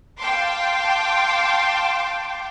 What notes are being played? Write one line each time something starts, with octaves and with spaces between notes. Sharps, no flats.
F5 G5 A5 C6 D6